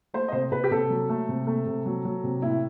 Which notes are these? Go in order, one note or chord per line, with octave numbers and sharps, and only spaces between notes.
A3 C5
D#5
C3 C5
C3 B4
G4
C3 A4
F#3
A3
C3
A3
C3
F#3
F#3
C3
A2 E4